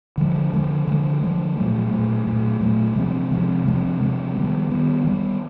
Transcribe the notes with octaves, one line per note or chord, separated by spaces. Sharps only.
D3 F3 G#3
D3 F3 G#3
D3 F3 G#3
D3 F3 G#3
A#2 F#3 A3
A#2 F#3 A3
A#2 F#3 A3
A#2 F#3 A3
C3 F3 G#3 C4
C3 F3 G#3 C4
C3 F3 G#3 C4
C3 F3 G#3 C4
D#3 G3 B3
D#3 G3 B3
D#3 G3 B3